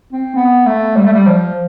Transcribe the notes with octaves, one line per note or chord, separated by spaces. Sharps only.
C4
B3
A3
G3
A3
G3
F3